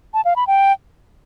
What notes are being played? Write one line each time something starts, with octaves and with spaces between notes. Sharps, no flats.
A5
F5
B5
G5